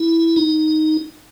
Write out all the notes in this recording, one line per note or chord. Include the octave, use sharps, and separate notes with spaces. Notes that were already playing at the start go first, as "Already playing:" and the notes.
Already playing: E4
D#4